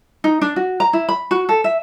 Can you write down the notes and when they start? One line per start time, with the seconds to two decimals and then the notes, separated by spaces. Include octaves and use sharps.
0.24 D#4
0.41 D4
0.56 F#4
0.80 A#5
0.93 E4
1.09 B5
1.31 F#4
1.49 A4
1.64 E5